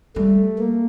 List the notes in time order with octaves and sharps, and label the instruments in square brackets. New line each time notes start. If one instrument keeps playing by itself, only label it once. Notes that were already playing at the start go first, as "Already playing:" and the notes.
[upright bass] G3 [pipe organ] A3
[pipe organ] A#3